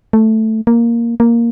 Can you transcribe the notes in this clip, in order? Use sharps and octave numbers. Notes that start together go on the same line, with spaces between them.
A3
A#3
A#3